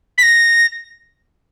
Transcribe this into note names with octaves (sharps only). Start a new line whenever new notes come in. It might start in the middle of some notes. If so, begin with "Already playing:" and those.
B6
A#6